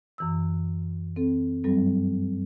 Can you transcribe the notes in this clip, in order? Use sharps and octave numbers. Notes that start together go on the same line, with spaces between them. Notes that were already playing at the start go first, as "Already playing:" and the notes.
F#2 E3 E6
C4 A4
G2 F#3 G3 C4 A4